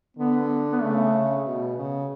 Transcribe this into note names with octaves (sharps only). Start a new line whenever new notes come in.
D3 B3
B3
C#3 A3
B2
C#3